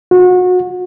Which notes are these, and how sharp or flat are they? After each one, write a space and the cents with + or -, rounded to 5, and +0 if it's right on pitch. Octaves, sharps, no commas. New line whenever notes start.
F#4 -30